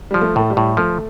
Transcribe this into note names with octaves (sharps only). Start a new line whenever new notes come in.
F3 G3
A3
A2 A3
G3
A2
F3 A3